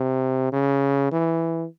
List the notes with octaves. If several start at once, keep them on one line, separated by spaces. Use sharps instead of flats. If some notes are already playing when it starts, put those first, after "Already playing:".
Already playing: C3
C#3
E3